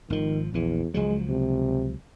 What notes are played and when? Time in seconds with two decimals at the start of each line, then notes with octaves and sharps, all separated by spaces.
0.10 G#1 D#3 F3
0.54 A#1 E2 E3
0.94 C#2 F3 F#3 G#3
1.29 C3